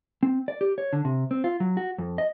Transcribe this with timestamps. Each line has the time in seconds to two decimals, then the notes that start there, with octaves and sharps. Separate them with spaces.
0.23 C4
0.48 D5
0.61 G4
0.78 C#5
0.93 D3
1.05 C3
1.31 C4
1.44 F4
1.60 F#3
1.77 F#4
1.98 F2
2.18 D#5